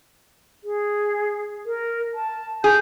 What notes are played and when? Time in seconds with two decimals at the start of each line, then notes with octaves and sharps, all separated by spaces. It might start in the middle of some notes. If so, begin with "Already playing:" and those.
0.64 G#4
1.66 A#4
2.14 A5
2.64 G#4 G6